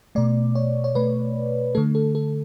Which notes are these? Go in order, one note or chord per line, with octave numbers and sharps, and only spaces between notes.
B2 A3 D5
C#5
C#5
B2 A3 B4
D3 A3 A4
A4
A4